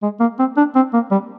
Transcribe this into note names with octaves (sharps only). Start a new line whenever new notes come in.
G#3
A#3
C4
D4
C4
A#3
G3